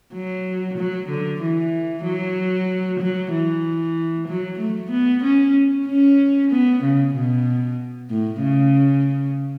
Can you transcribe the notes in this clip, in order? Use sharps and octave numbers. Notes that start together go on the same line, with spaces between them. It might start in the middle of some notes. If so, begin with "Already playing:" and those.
F#3
F#3
D3
E3
F#3
F#3
E3
F#3
A3
B3
C#4
C#4
B3
C#3
B2
A2
C#3